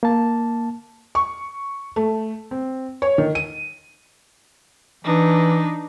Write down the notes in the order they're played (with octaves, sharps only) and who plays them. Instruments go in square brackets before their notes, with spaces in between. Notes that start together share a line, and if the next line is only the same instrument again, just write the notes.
[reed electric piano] A#3 A5
[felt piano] C#6
A3
C4
C#5
D#3
D#7
[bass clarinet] E3 [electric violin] D4 D#4